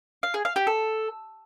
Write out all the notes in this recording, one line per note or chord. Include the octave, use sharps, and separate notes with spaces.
F5
G#4
F5
G4
A4